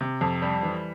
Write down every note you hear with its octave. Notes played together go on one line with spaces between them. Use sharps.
C3
F2
G3
E3